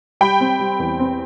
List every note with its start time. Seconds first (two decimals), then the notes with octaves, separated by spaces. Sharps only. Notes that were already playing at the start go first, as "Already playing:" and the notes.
0.21 G3 G5 B5
0.40 C4
0.60 G3
0.79 E2
0.99 C4